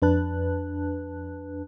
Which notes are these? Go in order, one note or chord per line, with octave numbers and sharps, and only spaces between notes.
F2 D4 B4 A5 F#6